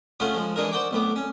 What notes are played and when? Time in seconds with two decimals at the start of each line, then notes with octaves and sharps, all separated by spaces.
0.20 C#3 A3 C#4 F4 F#5
0.35 F3 G#3
0.56 E3 G#3 D4 D#4 A#4
0.71 C5 D5 F#5 G5 C#6 D6
0.91 B1 A2 B3 D6
1.16 C#4